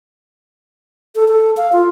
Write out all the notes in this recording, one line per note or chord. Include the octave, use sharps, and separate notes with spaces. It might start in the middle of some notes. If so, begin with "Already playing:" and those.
A4
A4
F5
F4